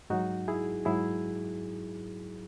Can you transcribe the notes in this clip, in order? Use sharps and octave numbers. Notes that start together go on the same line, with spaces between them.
G#2 F#3 D#4 F#4
E4 G#4
G#2 F#3 E4 G#4